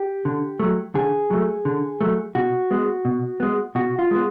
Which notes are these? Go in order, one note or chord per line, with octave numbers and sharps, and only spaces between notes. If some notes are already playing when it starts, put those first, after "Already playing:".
Already playing: G4
D3
F#3 A3
D3 G#4
F#3 A3
D3
F#3 A3
B2 F#4
G#3 B3
B2
G#3 B3
B2 F#4
F4
G#3 B3